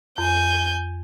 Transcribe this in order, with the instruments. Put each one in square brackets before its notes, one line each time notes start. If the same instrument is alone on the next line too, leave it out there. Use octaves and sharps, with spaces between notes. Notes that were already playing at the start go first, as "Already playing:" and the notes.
[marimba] F2 [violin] G#5 G6